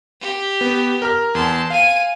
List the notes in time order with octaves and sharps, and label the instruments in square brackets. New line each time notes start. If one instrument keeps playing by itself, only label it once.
[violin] G4
[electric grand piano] B3
A#4 A#5 F6
[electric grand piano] E2 [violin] A5 C6
[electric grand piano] F5 [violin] G#5 D#7